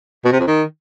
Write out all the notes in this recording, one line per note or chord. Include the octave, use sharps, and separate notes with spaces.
B2
C3
F2
D#3